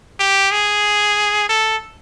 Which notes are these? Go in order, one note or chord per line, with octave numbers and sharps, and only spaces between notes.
G4
G#4
A4